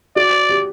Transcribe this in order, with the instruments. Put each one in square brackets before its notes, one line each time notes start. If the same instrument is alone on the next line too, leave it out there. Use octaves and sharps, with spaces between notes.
[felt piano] F#4 [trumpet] D5
[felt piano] G4